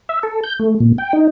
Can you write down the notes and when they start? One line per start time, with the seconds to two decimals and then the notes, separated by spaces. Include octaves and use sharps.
0.09 E5
0.23 A4
0.44 G6
0.59 A3
0.80 A#2
0.98 G5
1.13 D#4